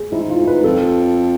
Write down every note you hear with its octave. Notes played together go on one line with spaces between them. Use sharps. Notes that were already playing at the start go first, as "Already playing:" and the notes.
Already playing: G#4
G#2 E4
F4
G#2
B4
F2 A4